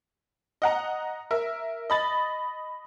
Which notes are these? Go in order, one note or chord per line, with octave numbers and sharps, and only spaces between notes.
D#5 F#5 A#5
A#4 E5
D#5 B5 A6